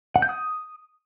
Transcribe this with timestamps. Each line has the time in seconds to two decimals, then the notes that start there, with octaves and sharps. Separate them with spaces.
0.16 F#5
0.22 G6
0.29 D#6